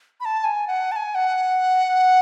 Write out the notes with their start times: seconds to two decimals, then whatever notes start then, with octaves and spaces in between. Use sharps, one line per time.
0.20 B5
0.25 A5
0.44 G#5
0.67 F#5
0.92 A5
0.96 G#5
1.15 F#5